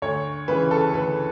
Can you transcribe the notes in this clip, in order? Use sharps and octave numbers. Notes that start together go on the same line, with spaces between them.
D2 C#5
C#3 E3 B4
A4
D2 B4